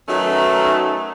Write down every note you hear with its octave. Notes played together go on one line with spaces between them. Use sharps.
D#3 F#3 A3 B3 C#4 D#4